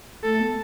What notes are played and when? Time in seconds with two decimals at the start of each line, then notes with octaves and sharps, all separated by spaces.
0.24 A3 A4
0.41 B3